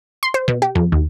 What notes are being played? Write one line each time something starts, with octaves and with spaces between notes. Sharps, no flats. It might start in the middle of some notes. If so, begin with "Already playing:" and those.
C6
C5
B2
G4
F2
D#2